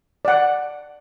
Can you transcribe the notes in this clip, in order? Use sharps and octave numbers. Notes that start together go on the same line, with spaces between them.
D5 F#5